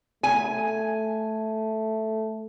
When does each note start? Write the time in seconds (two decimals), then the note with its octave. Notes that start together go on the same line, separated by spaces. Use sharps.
0.23 A3 G#5